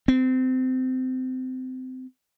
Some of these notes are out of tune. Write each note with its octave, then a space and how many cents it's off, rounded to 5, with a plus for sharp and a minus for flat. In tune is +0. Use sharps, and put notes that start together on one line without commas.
C4 -25